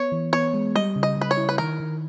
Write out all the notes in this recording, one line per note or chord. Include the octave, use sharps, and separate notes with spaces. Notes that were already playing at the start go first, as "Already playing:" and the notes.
Already playing: B3 C#5
E3
B3 C#5
G#3
G3 D#5
C#3
D#5
C#3 B4
C#5
E4
B4
D#3 A#4
D#3